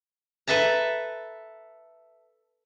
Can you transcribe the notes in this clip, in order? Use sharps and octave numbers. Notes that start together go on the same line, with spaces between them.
A4 B4 E5 A5 A#5